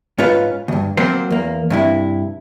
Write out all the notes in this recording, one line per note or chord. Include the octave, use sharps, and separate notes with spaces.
G#2 C#4 F4 B4 F5
D2 G2
F#3 A#3 C4 C5
E2 A#3
G2 C3 E4